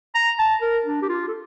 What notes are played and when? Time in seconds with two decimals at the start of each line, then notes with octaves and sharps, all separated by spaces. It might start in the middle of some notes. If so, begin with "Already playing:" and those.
0.15 A#5
0.39 A5
0.61 A#4
0.86 D4
1.02 G4
1.09 F4
1.28 A4